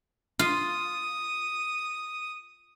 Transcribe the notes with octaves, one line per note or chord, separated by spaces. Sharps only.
F4 D#6